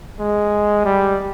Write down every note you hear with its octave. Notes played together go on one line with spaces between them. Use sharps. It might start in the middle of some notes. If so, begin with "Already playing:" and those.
G#3
G3